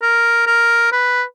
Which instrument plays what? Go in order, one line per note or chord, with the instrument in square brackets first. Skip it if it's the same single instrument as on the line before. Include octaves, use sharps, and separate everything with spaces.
[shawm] A#4
A#4
B4